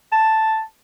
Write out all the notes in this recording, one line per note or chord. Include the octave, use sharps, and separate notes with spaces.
A5